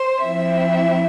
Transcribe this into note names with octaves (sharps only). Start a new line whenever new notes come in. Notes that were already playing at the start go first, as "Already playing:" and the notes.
Already playing: C5
F3 C4 E4 E5